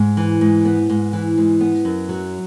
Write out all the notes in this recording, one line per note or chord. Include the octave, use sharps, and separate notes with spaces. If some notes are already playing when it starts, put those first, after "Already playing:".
Already playing: G#2
E3
G#2
B3
G#2
E3
G#2
B3
F#2
F#3